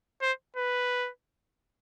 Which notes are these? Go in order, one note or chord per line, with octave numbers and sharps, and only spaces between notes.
C5
B4